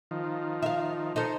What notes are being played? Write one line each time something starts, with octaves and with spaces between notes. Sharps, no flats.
D#3 F3
E5 F5
D#4 A4 C5